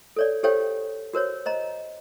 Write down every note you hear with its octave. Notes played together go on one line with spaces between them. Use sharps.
A4 C#5 D5
G4 A4 C5 C#5 F5 G5
F#4 A#4 C5 C#5
C5 D#5 A#5